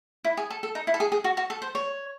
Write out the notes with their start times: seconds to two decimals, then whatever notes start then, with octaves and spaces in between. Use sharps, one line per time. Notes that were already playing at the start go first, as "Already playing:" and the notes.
0.24 E4
0.37 G#4
0.50 A4
0.63 A4
0.75 D#4
0.87 E4
0.94 A4
1.00 G#4
1.12 G#4
1.24 F#4
1.37 F#4
1.50 A4
1.62 C5
1.75 C#5